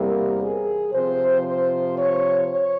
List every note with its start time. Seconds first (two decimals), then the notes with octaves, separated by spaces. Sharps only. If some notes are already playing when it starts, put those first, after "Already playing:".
Already playing: E2 C3 G3 A#3 A#4
0.41 G#4
0.93 C3 F3 C4 C5
1.44 C5
1.95 C#5
2.46 C#5